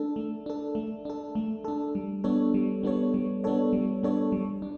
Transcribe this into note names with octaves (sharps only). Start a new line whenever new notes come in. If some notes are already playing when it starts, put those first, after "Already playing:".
Already playing: A3 D4 A4
A3
D4 A4
A3
D4 A4
A3
D4 A4
G3
B3 D4 A4 C#5
G3
B3 D4 A4 C#5
G3
B3 D4 A4 C#5
G3
B3 D4 A4 C#5
G3
D4